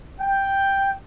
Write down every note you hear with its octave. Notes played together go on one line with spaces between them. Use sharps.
G5